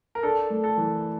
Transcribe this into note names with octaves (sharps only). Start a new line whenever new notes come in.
A#4
D4 A4
A3
A4
E3